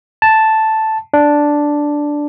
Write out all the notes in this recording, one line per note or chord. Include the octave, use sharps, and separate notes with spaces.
A5
D4